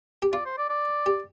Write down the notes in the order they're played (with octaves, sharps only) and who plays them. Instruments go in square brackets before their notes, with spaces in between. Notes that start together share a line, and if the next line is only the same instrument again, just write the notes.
[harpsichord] G4
[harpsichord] F4 [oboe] D5
[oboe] C5
D5
D5
[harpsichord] G4